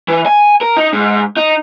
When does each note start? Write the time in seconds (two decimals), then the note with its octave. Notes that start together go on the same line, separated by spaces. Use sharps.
0.08 E3
0.26 G#5
0.61 A#4
0.77 D#4
0.93 G#2
1.37 D#4